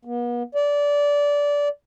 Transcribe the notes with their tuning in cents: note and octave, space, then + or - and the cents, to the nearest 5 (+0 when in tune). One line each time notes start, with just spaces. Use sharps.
B3 -45
D5 -20